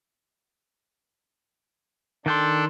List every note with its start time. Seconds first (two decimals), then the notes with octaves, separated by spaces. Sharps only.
2.26 D#3 D4 A4 G5 C6